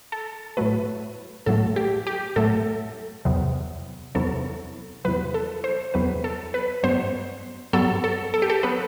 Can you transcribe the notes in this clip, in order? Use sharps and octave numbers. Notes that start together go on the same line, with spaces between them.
A4
A2 F#3 A3 B4
A2 F#3 A3 A4
G4
G4
A2 F#3 A3 A4
E2 C3 F#3 B3
E2 C3 F#3 B3 A4
E2 C3 F#3 B3 B4
A4
C5
E2 C3 F#3 B3 B4
A4
B4
G2 F#3 B3 C5
G2 F#3 B3 A4
A4
A4
G4
A4
F#3 B3 B4